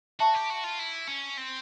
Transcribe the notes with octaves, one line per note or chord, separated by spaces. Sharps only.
F#4 E5 A5 C#6
G4
F#4
F4
E4
C#4
C4